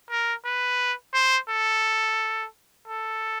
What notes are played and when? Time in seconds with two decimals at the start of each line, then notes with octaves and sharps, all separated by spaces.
0.10 A#4
0.44 B4
1.14 C5
1.49 A4
2.88 A4